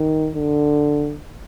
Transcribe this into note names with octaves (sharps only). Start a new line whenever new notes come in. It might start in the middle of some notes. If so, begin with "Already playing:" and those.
Already playing: D#3
D3